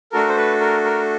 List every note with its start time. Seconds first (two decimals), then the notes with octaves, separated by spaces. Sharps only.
0.12 A3 D4 F#4 A4 A#4
0.28 C5
0.37 B4
0.61 A#4
0.84 A#4